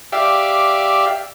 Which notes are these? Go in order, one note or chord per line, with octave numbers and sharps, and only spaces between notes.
G4 D5 E5 F5